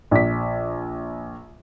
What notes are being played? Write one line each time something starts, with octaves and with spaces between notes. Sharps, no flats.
A#1 B6